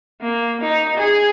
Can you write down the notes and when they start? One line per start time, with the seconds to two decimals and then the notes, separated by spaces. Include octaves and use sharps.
0.21 A#3
0.61 D#4
0.97 G#4